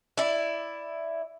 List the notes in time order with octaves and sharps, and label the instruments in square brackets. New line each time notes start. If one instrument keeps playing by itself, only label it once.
[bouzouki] E4 D5